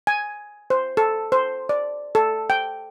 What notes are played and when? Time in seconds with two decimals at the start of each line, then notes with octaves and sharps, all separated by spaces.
0.07 G#5
0.70 C5
0.97 A4
1.32 C5
1.69 D5
2.15 A4
2.50 G5